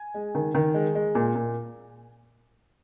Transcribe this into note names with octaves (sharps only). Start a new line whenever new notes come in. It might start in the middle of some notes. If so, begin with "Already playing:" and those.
Already playing: G#5
G#3
D#3
D#3
G#3
G#3
A#2
A#2